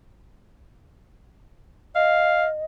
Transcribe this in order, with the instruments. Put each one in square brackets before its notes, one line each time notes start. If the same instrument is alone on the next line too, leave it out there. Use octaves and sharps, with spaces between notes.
[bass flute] D#5 [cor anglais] F5